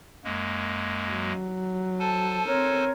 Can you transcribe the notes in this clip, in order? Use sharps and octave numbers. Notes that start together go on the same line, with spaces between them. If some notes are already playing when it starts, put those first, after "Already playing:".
F#2 G#3 A#3
F#3
A4 C5 G#5 A5
C4 A#4 C#5